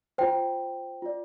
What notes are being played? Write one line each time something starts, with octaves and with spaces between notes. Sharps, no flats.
F4 C5 G5
F4 D5